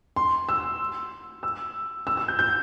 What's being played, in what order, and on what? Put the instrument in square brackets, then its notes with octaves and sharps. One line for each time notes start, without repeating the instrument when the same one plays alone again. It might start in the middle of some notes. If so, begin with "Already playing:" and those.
[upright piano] C6
E6
E6
E6
E6
G6
G6